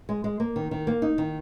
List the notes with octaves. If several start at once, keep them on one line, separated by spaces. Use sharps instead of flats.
G#3
G#3
A#3
D#3
D#3
A#3
D#4
D#3